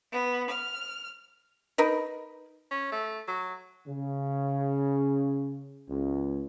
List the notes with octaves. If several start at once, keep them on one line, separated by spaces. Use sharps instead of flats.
B3
F6
D#4 A#4 B4
C#4
A3
F#3
C#3
C#2